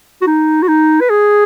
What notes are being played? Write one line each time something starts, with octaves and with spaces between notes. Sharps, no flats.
F#4
D#4
F#4
D#4
B4
G#4